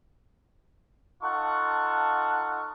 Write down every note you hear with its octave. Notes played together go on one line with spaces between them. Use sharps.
D#4 F4 A4 F#5 A5 C#6